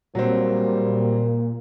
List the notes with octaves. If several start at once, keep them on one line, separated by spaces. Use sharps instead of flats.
A#2 F#3 G3 A#3 C4